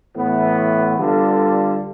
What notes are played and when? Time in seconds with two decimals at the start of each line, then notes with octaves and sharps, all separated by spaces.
0.16 A2 E3 B3
0.98 D3 G3 B3 F4 A4